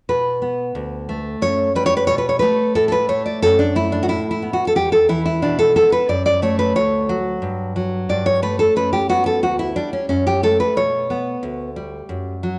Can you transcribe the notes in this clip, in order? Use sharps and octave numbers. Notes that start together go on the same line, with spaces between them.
B2 B4
B3
D2
A3
F#2 C#5
G3 B4
C#5
B4
B2 C#5
B4
C#5
A3 B4
A2 A4
A4
B4
A3 C#5
D5
F#2 A4
D4
A3 E4
D4
F#4
A2 E4
E4
B3
F#4
A4
E2 G4
A4
E3 E4
E4
B2 D4
A4
B3 A4
B4
F#2 D5
D5
A3 C#5
B4
D2 C#5
F#3
G2
F#3
G2 D5
C#5
A3 B4
A4
F#2 B4
G4
B3 F#4
A4
D2 F#4
E4
G3 D4
C#4
F#2 C#4
G4
A3 A4
B4
B2 C#5
B3
D2
G3
F#2
F#3